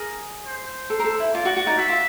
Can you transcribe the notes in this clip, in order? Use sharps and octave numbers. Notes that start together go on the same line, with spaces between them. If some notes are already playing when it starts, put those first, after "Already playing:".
Already playing: G#4 A#4
C5
A4
A#4
A4
E4
F4 D5
F#4
F#4
D#4
F#4 E5
F4